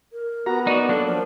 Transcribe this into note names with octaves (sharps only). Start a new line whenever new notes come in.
A#4
B3 F#4 A#5
D#4 F#4 D5
F#3 A#3 D4 A4
F3 A#4